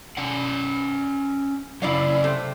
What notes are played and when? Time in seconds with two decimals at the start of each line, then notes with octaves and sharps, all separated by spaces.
0.17 C#4 D5 F#5
1.82 C#3 F#3 E4 D5 F5
2.24 C3 A3 C4